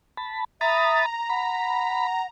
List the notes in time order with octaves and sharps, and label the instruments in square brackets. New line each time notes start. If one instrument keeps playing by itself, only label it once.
[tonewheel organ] A5 B5
[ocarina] E5 [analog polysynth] A#5 [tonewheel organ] B5 D#6 A6
[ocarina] F#5 [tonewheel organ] B5